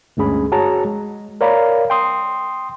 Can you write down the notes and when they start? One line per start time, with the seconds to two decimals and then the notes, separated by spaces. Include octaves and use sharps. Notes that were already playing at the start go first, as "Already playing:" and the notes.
0.17 D2 G2 G#3 C#4 G#4 B5
0.52 F#4 G#4 C#5 A5 A#5
0.85 G#3
1.41 A#4 C#5 D5 F5 A#5 B5
1.90 G5 C6 D#6